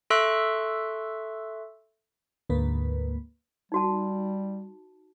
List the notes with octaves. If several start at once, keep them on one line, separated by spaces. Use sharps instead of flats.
A4 E5 C6 C#6 E6 F#6
D2 G#2 A#3 B4
G3 D#4 F#4 A5